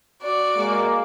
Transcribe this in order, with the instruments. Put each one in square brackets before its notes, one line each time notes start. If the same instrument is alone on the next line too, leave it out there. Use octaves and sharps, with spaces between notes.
[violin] F#4 D5
[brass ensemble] G#3 A#3